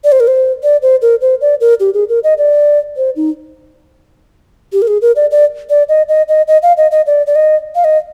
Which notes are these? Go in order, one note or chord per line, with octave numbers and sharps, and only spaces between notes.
D5
C5
A#4
C5
D5
C5
A#4
C5
D5
A#4
G4
G#4
A#4
D#5
D5
C5
D#4
G4
A#4
G#4
A#4
D5
D5
D5
D#5
D#5
D#5
D#5
F5
D#5
D#5
D5
D5
D#5
F5
D#5